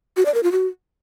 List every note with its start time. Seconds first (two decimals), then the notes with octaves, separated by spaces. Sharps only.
0.17 F#4
0.26 D5
0.34 A#4
0.43 F4
0.52 F#4